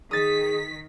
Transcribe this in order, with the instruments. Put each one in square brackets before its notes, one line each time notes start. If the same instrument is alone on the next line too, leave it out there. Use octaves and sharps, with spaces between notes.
[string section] D#3 B6 [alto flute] G#4 [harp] D#6 A6